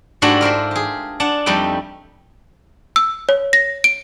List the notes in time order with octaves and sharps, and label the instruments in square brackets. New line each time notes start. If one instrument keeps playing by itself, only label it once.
[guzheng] G#2 G3 A3 D4 E4 F#4
F4 A#4 C5 E5
G4 G#4
D4 F#5 A5
F2 G3 A3 D#4 B4 G5
[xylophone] E6
C#5
A#6
D7